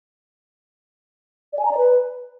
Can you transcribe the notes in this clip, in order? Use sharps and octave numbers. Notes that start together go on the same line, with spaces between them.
D5
G#5
A#5
D5
B4